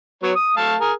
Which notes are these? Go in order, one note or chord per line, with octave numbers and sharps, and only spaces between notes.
F#3 B3 C#5
D#6
A3 F5 A5
G#4 A#4